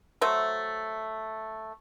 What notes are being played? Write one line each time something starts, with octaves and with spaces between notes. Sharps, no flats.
F#3 A3 C5 E5